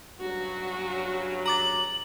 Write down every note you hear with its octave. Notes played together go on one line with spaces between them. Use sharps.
G2 C#3 F#3 F#4
A#5 D6 A6 F#7